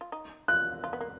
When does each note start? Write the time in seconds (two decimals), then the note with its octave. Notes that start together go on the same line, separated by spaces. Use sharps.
0.01 F4
0.12 D#4
0.48 F4 F#6
0.84 F4
0.93 B3
1.01 A#3